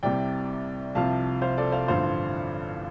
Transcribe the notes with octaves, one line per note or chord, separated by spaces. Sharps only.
C2 C3 G3 D5 G5
C2 C3 F3 F5 A5
C5 F5
A4 D5
C5 F5
A1 G2 D3 F3 C5 F5